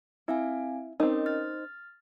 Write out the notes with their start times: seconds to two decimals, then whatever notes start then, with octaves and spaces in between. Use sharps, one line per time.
0.28 C4 E4 F5 G#5
1.00 C4 C#4 D#4 A#4 D#5
1.26 F6 A6